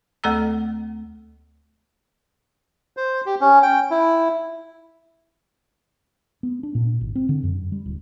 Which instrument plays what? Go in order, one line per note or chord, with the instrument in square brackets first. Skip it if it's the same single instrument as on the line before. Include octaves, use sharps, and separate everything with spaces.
[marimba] D2 A3 A4 F#5 A#5 E6
[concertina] C5
G4
C#4
G5
E4
[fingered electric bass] B3
D4
A#2
G#1
C4
D3
F#2
G3
D1